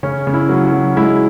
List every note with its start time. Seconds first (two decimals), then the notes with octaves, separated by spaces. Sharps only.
0.03 C#3 C#4
0.27 C#3
0.33 E4
0.49 F#3
0.65 F#4
0.72 F#3
0.96 G#3 E4